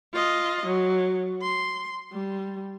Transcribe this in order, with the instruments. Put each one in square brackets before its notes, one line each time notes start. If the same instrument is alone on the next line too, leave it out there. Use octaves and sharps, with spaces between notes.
[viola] F4 D#5
F#3
C6
G3